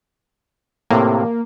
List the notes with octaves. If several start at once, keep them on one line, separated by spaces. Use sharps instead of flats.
A2 C3 A#3